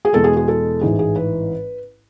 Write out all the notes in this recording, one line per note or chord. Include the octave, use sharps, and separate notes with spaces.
G#4
E2 B2 G#3 A4
G#4
G#4
A4
A1 G#2 E3 G#4
G#4
B4